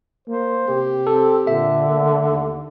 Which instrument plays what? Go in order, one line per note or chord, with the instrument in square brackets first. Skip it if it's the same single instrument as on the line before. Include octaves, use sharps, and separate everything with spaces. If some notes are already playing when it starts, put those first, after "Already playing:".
[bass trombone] A#3 [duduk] C5
[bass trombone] C3 [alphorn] G4
[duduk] C4 [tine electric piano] A4
[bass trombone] A#2 [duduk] D3 [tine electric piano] A4 E5
[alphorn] A3 [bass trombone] A#3
[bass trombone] D#2